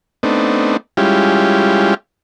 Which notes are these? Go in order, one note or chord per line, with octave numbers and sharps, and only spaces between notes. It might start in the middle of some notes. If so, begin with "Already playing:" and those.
A3 B3 C4 D4 D#4
G3 G#3 C#4 E4 F4 G4